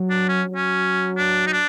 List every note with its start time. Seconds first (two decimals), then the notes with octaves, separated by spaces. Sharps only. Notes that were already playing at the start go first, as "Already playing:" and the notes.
Already playing: F#3
0.10 D4
0.29 C#4
0.46 F#3
0.56 C#4
1.17 D4
1.47 D#4
1.53 D4